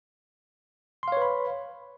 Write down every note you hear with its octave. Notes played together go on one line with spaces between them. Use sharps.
B4 C#5 F5 B5 C6